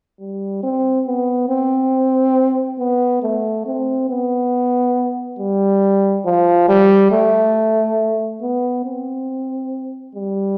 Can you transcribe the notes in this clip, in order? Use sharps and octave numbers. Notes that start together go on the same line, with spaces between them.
G3
C4
B3
C4
B3
A3
C4
B3
G3
F3
G3
A3
B3
C4
G3